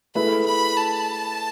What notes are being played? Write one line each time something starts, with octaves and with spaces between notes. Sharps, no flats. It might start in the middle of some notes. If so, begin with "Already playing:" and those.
A3 E4 G#4 B4 B5
B5
A5